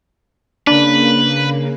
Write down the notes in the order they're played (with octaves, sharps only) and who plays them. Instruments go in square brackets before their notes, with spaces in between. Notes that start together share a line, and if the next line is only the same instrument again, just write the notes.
[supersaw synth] C#3 A#3 [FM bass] D4 [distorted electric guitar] B4